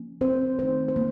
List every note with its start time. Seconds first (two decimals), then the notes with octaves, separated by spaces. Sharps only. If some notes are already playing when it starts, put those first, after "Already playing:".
Already playing: F3 A#3 C#4
0.21 C4 C5
0.59 D#3 A3 C4 D#4 C5
0.88 C5
0.96 A#3